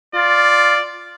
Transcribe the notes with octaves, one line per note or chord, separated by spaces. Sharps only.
F4 D5